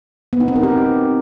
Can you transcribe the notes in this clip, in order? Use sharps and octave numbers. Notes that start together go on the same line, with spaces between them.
B3
D#4
C4
A#4
G4